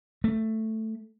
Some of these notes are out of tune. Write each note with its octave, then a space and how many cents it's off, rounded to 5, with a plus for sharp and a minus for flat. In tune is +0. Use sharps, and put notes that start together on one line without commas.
A3 +5